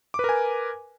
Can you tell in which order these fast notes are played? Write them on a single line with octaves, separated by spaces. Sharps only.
D6 B4 A#4 G#5